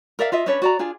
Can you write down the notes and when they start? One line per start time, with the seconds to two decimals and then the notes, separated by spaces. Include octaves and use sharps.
0.19 A#4 D5 E5 F5
0.32 F4 D#5 E5
0.46 C#4 D4 B4 C#5
0.62 F#4 D5 A#5
0.79 D4 F4 G#4